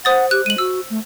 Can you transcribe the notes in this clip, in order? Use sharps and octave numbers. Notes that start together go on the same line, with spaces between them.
C5 F#5 D#6 A6
G4 F#6
G#3 D#7 F#7
F#4 E6
A3